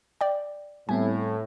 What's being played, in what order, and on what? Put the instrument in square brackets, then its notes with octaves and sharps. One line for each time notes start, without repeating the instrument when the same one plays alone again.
[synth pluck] D5 G5
[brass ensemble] A2 [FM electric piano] G3 B3 C4 [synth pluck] G#5